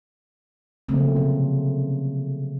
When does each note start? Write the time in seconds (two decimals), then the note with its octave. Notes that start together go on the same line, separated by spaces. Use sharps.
0.89 C#3 F3 F#3 A3 A#3 C4
1.16 C3